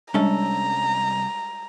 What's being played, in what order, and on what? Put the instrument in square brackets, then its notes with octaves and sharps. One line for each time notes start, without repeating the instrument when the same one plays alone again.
[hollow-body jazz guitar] C2 C#4 A4 [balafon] G3 G#3 D4 [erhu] A#5